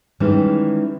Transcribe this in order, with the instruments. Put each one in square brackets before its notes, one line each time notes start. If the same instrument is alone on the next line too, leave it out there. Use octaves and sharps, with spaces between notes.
[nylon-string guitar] D#3 E3 G3 G#3 C#4